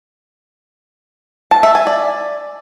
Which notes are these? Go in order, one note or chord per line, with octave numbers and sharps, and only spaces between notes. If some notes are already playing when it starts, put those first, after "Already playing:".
A5
E5
G#5
D5